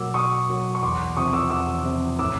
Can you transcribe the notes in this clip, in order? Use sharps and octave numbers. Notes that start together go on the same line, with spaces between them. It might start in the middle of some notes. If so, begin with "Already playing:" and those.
Already playing: B2 F#3 A#3 D6 E6
B2 C#6 D#6
F#3 A#3
C#6
E2 C6 D6
C3 F3 C#6 D#6
D6 E6
E2 D6 E6
C3 F3
A2 D6 E6